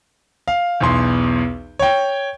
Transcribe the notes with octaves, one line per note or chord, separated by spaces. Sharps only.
F5
B1 E2 C6
C#5 G5